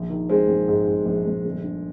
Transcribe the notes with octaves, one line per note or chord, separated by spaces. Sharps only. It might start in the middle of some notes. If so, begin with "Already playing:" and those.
Already playing: A#1
D#3
D#3 G#3 C4
A#1
G#2
G#2
A#1
A#1
G1
D3